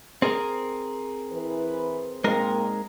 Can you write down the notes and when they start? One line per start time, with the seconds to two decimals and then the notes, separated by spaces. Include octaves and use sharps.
0.22 C4 G#4 A#4
1.32 E3 B4
2.24 A#2 G#3 A#3 C4 D#4 A#4